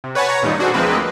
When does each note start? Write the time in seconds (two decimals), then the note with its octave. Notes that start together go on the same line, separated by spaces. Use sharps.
0.04 C3
0.15 B4 C#5 F#5 G#5 A5
0.29 C#5 A#5
0.42 F#2 A#2 D#3 G3 D#4
0.59 D4 F#4 G#4 A4 C5
0.74 D2 F3 G#3 A#3 C4 B4